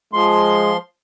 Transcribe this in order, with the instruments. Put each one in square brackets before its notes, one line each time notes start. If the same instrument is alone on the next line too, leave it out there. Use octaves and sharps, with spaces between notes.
[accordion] F3 C6 [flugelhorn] G#3